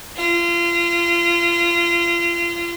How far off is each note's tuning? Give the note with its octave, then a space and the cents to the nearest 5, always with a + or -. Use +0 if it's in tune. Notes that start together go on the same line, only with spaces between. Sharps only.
F4 -30